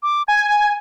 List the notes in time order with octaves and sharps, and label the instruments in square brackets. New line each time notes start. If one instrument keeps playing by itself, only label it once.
[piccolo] D6
[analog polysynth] G#5 [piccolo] G#6